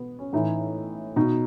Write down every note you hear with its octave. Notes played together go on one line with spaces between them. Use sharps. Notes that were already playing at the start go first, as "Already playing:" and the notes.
Already playing: B2 B3
C#4
A2 E3 D#4
B2 D#4